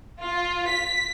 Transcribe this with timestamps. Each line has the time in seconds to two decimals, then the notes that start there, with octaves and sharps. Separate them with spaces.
0.22 F4
0.70 B6